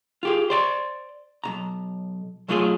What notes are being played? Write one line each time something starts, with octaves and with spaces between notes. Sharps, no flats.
F4 G4 G#4
C5 D5 B5 C6
B1 G2 A#5
B2 F#3 A3 F4 F#4 G#4